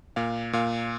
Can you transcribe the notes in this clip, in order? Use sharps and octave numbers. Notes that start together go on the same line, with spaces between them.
A#2 F5
A#2 F5